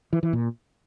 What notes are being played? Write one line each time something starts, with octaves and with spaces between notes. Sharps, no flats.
E3
E3
A#2